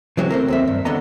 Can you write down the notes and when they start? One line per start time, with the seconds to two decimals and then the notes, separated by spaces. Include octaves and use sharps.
0.17 C#3 E3 F#3 G#3 C4
0.30 A3 C4 A#4
0.48 D#2 C4 E5
0.68 G2
0.85 D3 D#3 B3 D#5 A#5